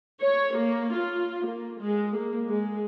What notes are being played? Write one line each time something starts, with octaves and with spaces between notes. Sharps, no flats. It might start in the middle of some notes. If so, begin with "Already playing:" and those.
C#5
A#3
F4
A#3
G#3
A#3
G#3